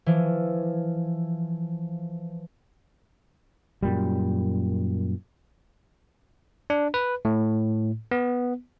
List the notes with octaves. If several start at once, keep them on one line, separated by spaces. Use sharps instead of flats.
E3 F3
F#2 A#2 G3
D4
B4
A2
B3